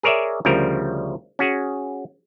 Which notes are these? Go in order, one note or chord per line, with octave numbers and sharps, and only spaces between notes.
G#4 A#4 C#5 D5 E5
D2 C#3 F3 G3 A#4
C#4 F#4 G#4